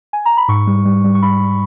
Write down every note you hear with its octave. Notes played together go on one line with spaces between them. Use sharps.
G#5
A#5
B5
G#2 C#6
G3
G3
G3
C#6
G3 B5